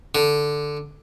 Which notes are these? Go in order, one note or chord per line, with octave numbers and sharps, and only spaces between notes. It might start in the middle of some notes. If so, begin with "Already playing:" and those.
D3